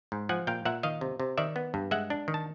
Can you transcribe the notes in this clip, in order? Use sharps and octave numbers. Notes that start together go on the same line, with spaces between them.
G#2
F3 F#5 G#5
A#2 F5 G5
A#2 E5 F#5
D#3 D#5 F5
C3
C3
D#3 D5 E5
B3
G2
G#3 E5 F#5
D4
D#3
A5